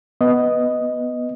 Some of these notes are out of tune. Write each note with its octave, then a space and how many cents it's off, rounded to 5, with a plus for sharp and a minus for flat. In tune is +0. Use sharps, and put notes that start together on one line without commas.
B3 +0 D#5 +0